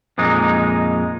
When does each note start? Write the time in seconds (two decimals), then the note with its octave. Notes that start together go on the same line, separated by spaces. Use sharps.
0.18 F2 A#2 G#3 D#4